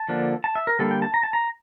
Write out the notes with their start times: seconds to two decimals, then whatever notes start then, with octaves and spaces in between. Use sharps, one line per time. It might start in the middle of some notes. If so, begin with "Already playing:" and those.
Already playing: A5
0.09 D3 F3 A#3 D4
0.44 A5
0.55 E5
0.67 A#4
0.79 D3 G3 A#3 A4
0.91 G5
1.02 A5
1.14 A#5
1.23 A5
1.33 A#5